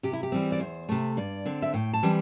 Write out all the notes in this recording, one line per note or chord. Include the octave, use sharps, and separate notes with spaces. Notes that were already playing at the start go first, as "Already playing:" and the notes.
C3 G4
E4
G4
E3 G3 C4
D5
E2 C5
C3 A3
G2 D5
D3 C4
E5
A2 G5
A5
E3 G3 C4